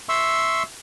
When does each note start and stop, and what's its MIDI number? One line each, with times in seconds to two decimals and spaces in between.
0.09 0.63 76
0.09 0.63 84
0.09 0.63 85
0.09 0.63 88